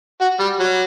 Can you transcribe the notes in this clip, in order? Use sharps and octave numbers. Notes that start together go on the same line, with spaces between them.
F#4
G3
F#3